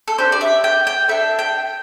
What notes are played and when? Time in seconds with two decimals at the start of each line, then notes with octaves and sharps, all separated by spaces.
0.08 A4
0.18 D4 G4 C5
0.32 D5
0.41 E5
0.64 G5
0.87 G5
1.09 D4 A4 E5
1.39 G5